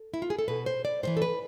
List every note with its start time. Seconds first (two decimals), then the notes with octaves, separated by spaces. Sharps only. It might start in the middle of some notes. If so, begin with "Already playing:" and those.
Already playing: A4
0.14 E4
0.22 F4
0.30 G#4
0.39 A4
0.48 B2 B4
0.66 C5
0.85 D5
1.03 A2 E3 C5
1.17 A4
1.22 B4